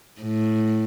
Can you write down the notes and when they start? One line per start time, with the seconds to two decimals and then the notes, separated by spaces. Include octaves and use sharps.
0.21 A2